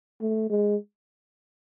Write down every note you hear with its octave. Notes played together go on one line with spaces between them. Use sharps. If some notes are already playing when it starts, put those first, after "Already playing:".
A3
G#3